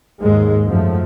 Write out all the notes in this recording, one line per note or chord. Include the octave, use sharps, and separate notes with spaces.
D#2 G#2 G#3
F#2 F3 A3